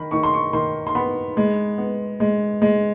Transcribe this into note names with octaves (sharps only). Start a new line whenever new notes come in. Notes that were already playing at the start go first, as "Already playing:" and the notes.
Already playing: D#3 B5
D#3 C#6
C6
C#6
D#3 C6
C6
B3 B5
G#3
B3
G#3
G#3